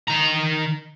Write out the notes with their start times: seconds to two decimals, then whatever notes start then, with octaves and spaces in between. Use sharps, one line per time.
0.08 D#3 A#5